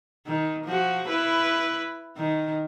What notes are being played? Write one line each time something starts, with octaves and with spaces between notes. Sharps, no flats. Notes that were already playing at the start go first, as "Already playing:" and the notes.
D#3
F3 F#4
E4 B4
D#3